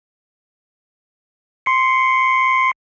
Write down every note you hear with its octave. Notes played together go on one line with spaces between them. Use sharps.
C6 C7 C#7